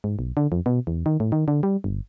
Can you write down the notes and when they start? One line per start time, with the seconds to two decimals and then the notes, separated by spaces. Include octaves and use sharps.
0.04 G#2
0.19 B1
0.37 D3
0.52 F2
0.66 B2
0.87 E2
1.06 D#3
1.20 A2
1.32 D#3
1.48 D3
1.63 G3
1.84 G1